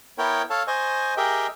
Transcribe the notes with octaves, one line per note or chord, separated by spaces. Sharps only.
B3 E4 A#4 C#5 G5
A4 C#5 F5 A5
C5 D#5 G#5 C#6
G4 G#4 A#4 D#5 E5 G5